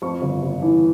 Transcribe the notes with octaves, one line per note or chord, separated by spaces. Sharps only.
F2 C#6
G1
G1
E3